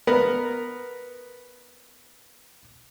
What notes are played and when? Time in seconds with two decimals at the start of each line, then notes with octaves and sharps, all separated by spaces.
0.07 B3 A#4